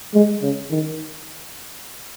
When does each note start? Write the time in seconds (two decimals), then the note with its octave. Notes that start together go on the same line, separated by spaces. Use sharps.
0.14 G#3
0.42 C#3
0.71 D#3